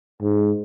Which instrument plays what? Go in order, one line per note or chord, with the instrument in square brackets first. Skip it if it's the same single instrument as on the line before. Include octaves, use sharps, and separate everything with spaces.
[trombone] G#2